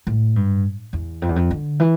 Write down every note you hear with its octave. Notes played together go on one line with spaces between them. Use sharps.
A2
G2
E2
F2
E2
F2
D3
E3